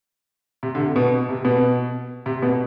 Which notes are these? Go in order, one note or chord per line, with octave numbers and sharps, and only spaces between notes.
C3
D3
C3
B2
C3
B2
C3
B2